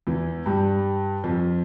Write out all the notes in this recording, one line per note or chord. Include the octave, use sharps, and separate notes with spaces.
E2 E3
G2 G3
F2 F3